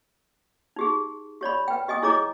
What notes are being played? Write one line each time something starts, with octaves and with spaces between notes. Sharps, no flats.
D#4 G4 G#4
G4 C#5 D5 B5
B4 G5
G4 D#5 G#5 D#6
E4 G#4 C#5 D#5 A#5 D6